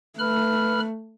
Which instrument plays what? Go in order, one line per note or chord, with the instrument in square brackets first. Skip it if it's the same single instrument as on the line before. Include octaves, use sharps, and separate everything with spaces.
[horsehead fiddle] A3 [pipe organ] B4 B5 F6